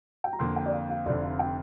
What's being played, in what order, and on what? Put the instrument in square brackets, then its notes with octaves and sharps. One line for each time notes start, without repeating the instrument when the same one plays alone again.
[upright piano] G5
A#5
[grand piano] F2 D3 A#3 [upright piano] C6
[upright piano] G5
D5
F5
F5
[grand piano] F1 F2 D3 [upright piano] D5
[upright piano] F5
G5